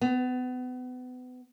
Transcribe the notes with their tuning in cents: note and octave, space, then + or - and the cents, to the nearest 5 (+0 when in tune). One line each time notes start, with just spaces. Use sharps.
B3 +30